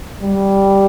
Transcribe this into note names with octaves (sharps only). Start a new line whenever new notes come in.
G3